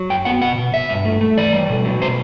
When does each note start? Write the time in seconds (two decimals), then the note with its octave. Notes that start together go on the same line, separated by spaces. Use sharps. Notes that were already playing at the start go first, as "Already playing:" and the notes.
Already playing: F#3
0.10 F#2 G5
0.25 B3 F#5
0.41 B2 F#5
0.58 B2
0.74 G2 E5
0.89 G2
1.05 A3
1.21 A3
1.37 E3 D5
1.53 G3
1.69 B2
1.85 F#3
2.01 B2 C5